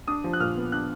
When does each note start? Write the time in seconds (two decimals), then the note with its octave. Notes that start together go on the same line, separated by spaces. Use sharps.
0.08 D4 D#6
0.24 F3
0.33 F#6
0.40 A#2 F6
0.57 B3
0.72 D4 F#6